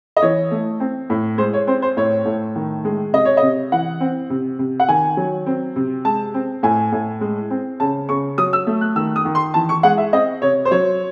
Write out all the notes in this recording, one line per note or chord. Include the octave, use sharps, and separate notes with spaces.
D#5
E3 C#5
A3
C4
A2
G#3 C5
C#5
C4 C5
C5
A2 C#5
A2
D#3
G#3
C3 D#5
C#5
D#5
C3
E3 F#5
C4
C3
C3
F#5
D#3 G#5
F#3
C4
C3
G#3 A5
C4
A2 G#5
A2
G#3
C4
C#3 A5
C#3 C#6
F#3 D#6
E6
A3
F#6
D#3 E6
D#6
D#3
C6
E3 A5
C#6
G#3 F#5
E5
C4 D#5
C3 C#5
C5
F#3 C#5